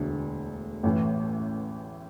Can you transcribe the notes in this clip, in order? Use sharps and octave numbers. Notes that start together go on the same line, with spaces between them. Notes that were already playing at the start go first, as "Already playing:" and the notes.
Already playing: E1 D2 D3
A1 A2 E3